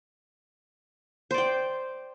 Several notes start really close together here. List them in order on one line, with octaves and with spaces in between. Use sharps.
C5 D5 G5